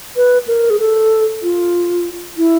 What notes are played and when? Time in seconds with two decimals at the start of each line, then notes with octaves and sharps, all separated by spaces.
0.16 B4
0.48 A#4
0.70 G#4
0.80 A4
1.43 F4
2.38 E4